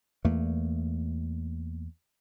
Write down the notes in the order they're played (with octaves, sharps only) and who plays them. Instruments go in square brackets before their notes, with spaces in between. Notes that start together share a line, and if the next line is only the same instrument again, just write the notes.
[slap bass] E2 A3 A#3